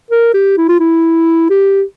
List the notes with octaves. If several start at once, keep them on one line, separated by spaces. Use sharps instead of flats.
A#4
G4
E4
F4
E4
G4